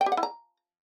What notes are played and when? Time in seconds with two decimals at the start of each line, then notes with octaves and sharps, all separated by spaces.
0.01 G5
0.06 G4
0.12 F#5
0.17 E4
0.23 A#5